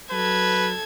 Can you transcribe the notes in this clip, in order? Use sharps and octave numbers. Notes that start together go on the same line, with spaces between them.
F#3 A4 B4 G#6